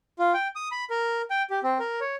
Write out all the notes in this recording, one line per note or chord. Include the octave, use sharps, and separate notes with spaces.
F4
G5
D#6
B5
A#4
G5
G4
C4
A#4
C#5